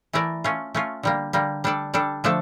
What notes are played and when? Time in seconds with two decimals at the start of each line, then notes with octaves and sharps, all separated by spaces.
0.13 E3 A3 E4 A#4 D5
0.44 A3 C#4 F4
0.75 A3 C#4 F4
1.03 D3 G3 A#3
1.33 D3 G3 A#3
1.64 G3 D4 A4 D5
1.94 G3 D4 A4 D5
2.24 D3 F3 A3 D4 A4